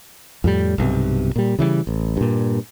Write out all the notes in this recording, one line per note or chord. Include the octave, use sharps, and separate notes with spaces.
F2 A2 G3
B1 G2 C3
A#2 G3
C#3 E3 F#3 G3
A1
G2 A#2